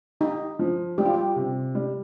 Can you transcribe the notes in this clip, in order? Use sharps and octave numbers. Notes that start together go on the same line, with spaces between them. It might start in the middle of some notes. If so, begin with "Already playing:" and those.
D#4 G4
F3
G3 G4
F4
G4
C3
G3